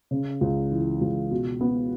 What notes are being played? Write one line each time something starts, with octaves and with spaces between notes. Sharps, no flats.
C#3
C#2
E3
C#2
B2
B3